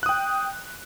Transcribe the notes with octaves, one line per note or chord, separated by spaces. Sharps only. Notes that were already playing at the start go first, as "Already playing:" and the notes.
G5 D#6 F#6